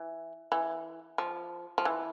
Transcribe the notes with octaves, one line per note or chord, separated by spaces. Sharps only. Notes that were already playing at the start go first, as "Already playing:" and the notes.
Already playing: E3
E3
F3
F3
E3